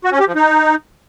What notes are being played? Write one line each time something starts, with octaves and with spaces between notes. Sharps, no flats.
F#4
C#4
G4
F3
D#4